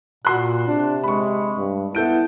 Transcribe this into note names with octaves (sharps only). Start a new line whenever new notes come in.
A#2 F#4 C6 F#6
C3 D4
G#3 B5 C#6
G2
B3 E4 A4 G6 D7